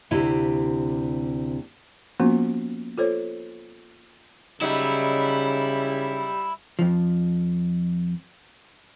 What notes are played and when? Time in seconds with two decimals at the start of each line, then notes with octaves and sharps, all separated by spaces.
0.11 D2 C3 E4 G4
2.20 F3 A#3 B3 C#4 F4 F#4
2.97 F4 A4 C5 C#5
4.61 C#3 F#3 G3 D#4 E4
6.79 F2 F3